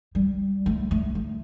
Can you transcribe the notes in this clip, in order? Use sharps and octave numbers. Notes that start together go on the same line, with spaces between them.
G3
A3
A3
A3